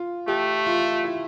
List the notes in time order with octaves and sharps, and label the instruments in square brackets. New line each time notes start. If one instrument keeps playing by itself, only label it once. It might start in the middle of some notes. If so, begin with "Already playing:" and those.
Already playing: [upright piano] F4
[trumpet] A3 [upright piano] G4
[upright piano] F4
E4